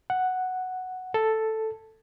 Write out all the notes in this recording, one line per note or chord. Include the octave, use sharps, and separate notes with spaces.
F#5
A4